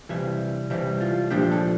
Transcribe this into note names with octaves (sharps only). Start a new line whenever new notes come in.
C3 E3 G3 E5
C3 E3 G3 E5
F4
A#2 F3 A#3 D4 G4
A4